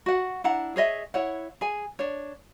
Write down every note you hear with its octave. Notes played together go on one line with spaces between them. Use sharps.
F#4 F#5
D4 E4 F#5 A#5
G#4 C#5 D#5 E5
E4 C#5 F#5
G#4 G#5
D4 C#5